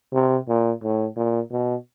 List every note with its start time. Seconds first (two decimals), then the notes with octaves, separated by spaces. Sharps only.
0.14 C3
0.48 A#2
0.83 A2
1.16 A#2
1.51 B2